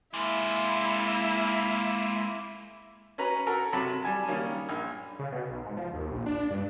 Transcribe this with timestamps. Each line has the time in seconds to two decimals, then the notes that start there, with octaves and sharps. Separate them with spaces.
0.14 G#3 A#3 E4
3.18 C#4 B4 A#5
3.46 F#4 A4 A#4 A#5
3.73 C3 F#3 A5 B5
4.03 G3 G#5 A5
4.28 D#3 G3 A#3 C#4
4.69 A#1
5.19 C#3
5.32 B2
5.49 B1
5.65 G#2
5.77 F3
5.93 D#2
6.11 A#1
6.26 D4
6.50 G2